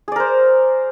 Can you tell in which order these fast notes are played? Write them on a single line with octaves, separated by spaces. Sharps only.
G#4 D5 A#4 C5